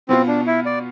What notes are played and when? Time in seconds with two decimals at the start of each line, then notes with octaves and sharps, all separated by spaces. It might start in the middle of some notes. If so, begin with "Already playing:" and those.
0.09 B2 B3 C4 F4
0.27 D4
0.47 E4
0.66 D5